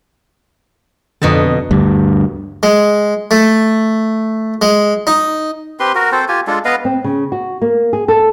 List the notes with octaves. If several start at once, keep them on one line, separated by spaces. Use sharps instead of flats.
F2 B2 D3 D#4 A5
D2 G2
G#3
A3
G#3
D#4
C4 G4 B4 C6
F#4 A#4
C4 A4 C5
F4 G4 G#5
G#3 D4 F4 A4
B3 B4 D#5 F5
C4
C#3
F#4
A#3
G#4
A4